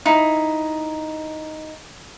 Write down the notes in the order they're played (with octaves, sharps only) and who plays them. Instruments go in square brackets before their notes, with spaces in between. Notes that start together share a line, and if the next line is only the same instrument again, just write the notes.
[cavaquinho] D#4 E4